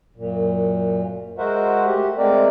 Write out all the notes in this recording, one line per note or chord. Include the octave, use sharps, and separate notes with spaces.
F#2 A#2
G#3 F#4 A#4 C5 E5 F#5
A3 G4
G#3 A3 C4 A#4 D5